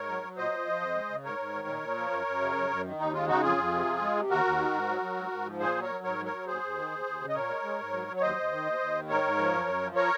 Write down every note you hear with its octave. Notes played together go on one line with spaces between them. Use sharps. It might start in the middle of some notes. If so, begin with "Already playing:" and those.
Already playing: G#2 A#4 C#5
F#3
F#3
A#2 C5 D#5
A#2
F3
F2
G#3
C#3
G#2 A#4 C#5
G#2
D#3
A#2
A#2
F3
F#2
F#2
C#3
F#2
F#2
D#3
D#2 D#4
G#3 F4
C#3 D#4 F#4
F2 F4 G#4
F2
C3
F2
G#3
C3
D#2 F#4 A#4
D#2
D#3
G#2
F#3
F#3
G#2
G#2
F3
A#2 G#4 C5
F#3
A#4 C#5
F#3
G#2 A#4 C#5
F#3
A#4 C#5
F#3
D#2 G#4 C5
D#2
D#3
D#2
D#2
C#3
D#5
A#2 A#4 C#5
G#3
G#3
G#2
F#3
F#3
C#5
D#2 C5 D#5
D#2
D#3
D#2
D#2
D#3
G#2 A#4 C#5
G#2
F3
F#2
F#2
F3
A#4 C#5